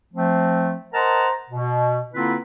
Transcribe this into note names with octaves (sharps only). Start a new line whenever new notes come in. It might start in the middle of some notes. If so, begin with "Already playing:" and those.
F3 A3 C4
A#4 C5 D#5 F#5 A5 A#5
B2
D3 A#3 C4 E4 F4 B4